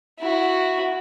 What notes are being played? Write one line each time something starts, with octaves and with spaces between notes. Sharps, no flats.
E4 F#4